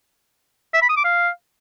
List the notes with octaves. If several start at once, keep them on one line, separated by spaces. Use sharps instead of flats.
E5
B5
D#6
D6
F5